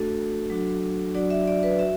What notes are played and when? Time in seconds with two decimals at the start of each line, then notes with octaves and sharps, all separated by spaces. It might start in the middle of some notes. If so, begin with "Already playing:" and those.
Already playing: A3 D4 F#4 A4
0.50 F#3 D4 F#4
1.15 F#3 D4 F#4 D5
1.30 E5
1.48 D5
1.63 B4
1.79 F#4 E5